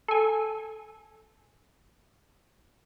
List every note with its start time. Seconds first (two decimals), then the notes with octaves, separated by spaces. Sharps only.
0.08 A4 G#5